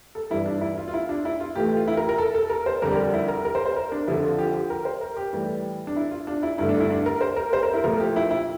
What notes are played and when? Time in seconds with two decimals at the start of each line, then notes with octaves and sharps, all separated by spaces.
0.15 A4
0.30 G2 E3 G3 E4
0.46 D4
0.61 E4
0.78 F4
0.88 F4
0.94 E4
1.09 D4
1.25 E4
1.40 F4
1.55 A2 E3 A3 G4
1.66 G4
1.77 F4
1.88 E4
1.97 A#4
2.09 A#4
2.18 A4
2.35 A4
2.50 A#4
2.66 C5
2.82 F2 D3 G3 A#4
2.92 G4
3.14 E4
3.28 A#4
3.45 A#4
3.55 C5
3.66 C5
3.76 A#4
3.92 D4
4.07 F2 D3 F3 E4
4.23 F4
4.38 G4
4.54 G4
4.70 A#4
4.85 C5
5.01 A#4
5.17 G4
5.33 A2 E3 G3
5.87 D4
5.96 E4
6.11 F4
6.27 D4
6.43 E4
6.58 G2 D3 A3 E4
6.69 D4
6.80 E4
6.91 D4
7.06 A#4
7.21 C5
7.36 A#4
7.53 C5
7.63 A#4
7.74 E4
7.84 A#2 F3 A3 A#4
8.00 G4
8.16 E4
8.31 E4